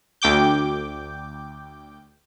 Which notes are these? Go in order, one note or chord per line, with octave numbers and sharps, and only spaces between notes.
D2 G5 D6 G6